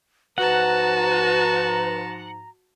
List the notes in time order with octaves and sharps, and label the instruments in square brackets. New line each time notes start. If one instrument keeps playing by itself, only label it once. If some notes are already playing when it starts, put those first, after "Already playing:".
[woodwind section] G#2 F3 A#5 [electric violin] F#4 A5 [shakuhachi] B4 [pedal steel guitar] F#5